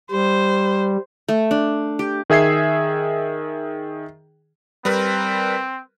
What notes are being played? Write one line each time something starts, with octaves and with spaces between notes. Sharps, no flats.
G3 C5
A3
D4
G4
D#3 G#4 E5 G#6 C7
G3 C4 A#4 B4